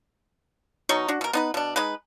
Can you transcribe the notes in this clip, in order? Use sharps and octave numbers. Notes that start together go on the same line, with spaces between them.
B2 F#3 D#4 C#6
D4 F#4
B2 A#4
B3 D#4 B4
B2 D4
G#3 D#4 B4